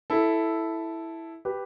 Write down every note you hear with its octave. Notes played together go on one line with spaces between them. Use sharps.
E4 A4
G4 B4